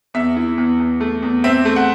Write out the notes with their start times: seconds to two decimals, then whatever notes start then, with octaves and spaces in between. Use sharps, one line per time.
0.14 E2 E5
0.36 E4
0.58 E2
0.80 E2
1.00 A3
1.22 E2
1.44 C4 E5
1.65 A3
1.76 F#5